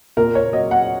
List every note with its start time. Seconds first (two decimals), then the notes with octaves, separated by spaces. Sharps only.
0.17 A#2 A#4
0.35 C#5
0.53 F#3 D#5
0.71 F#5